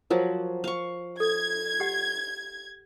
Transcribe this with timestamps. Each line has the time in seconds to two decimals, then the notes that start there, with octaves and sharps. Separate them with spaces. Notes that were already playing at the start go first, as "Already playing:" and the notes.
0.10 F3 F#3 A#4 C5
0.64 F5 C#6
1.20 A4 G#6
1.80 G4 F#5